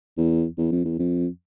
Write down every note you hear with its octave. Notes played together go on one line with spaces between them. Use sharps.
E2
E2
F2
E2
F2